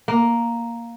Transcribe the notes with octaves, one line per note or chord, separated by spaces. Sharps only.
A#3